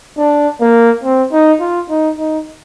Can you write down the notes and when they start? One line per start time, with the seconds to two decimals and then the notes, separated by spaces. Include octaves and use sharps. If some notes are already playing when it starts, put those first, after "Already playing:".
0.18 D4
0.61 A#3
1.04 C4
1.32 D#4
1.61 F4
1.90 D#4
2.19 D#4